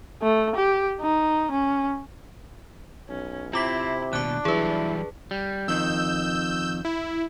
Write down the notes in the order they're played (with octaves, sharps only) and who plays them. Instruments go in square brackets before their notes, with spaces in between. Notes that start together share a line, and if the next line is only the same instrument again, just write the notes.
[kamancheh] A3
G4
D#4
C#4
[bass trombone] B1 [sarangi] C#4
[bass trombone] C3 [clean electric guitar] C4 [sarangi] E4 [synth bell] F4 D6 B6
[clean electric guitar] D#2 B2 [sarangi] D4 [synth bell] D6 F#6
[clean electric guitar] E3 F#3 G3 [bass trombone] E4 [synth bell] G#4 B4
[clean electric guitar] G3
[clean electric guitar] F2 D#3 [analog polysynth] E6 G6
[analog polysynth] E4